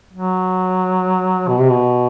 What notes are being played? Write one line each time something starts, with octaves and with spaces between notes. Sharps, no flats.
F#3
B2
C3
B2